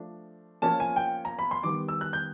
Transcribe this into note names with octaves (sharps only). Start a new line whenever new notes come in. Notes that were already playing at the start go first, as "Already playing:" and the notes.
Already playing: F3 A3 D4
F3 A#3 C#4 F4 A5
G#5
G5
A#5
B5
C6
D#3 G3 B3 D6
E6
F#6
G6